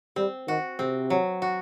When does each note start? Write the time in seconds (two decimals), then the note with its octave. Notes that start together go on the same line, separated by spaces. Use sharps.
0.16 G3 C4
0.47 D#3 F#4
0.79 C3 C4
1.10 F#3
1.42 F#4